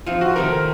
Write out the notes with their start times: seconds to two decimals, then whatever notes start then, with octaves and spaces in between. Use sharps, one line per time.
0.06 F3 C4 D#4 F4
0.21 F#4
0.36 C3 D#3 A3 A#4